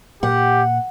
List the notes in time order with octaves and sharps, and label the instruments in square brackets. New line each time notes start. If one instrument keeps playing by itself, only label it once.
[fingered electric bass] A#2 [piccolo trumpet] G4 [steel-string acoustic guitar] F#5